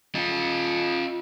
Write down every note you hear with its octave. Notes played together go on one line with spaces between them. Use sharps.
F4 D#5